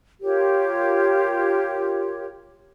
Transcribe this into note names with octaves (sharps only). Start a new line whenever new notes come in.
F4 G4 A#4 C#5